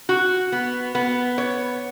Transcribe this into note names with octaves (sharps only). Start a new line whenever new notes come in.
F#4
B3
B3
C#5